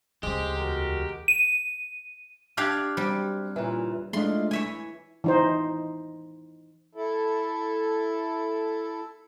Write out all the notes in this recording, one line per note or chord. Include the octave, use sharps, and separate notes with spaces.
D2 C#3 G#3 G4 C5
E2 F#4 A#4
D#7
D4 G4 F5 F6 F#6 G#6
F#2 G3 C4
A#2 C#3 E3
G#3 A3 D4 E4 F4 D#5 C6
E3 C#5 E5 G#5
E3 D#4 C5
E4 A4